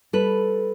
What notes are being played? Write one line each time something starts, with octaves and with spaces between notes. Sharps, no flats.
G3 A4 B4